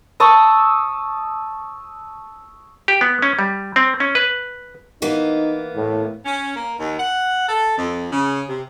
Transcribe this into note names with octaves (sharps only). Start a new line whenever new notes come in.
A5 C#6 D#6 E6
G4
B3
C#4
G3
C4
C#4
B4
E3 A#3 B3 D#4
A2
C#4
A#3
D#2
F#5
A4
F2
C#3
C3